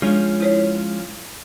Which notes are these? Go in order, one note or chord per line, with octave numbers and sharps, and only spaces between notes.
F3 G#3 C#4 D4
E4 C5 C#5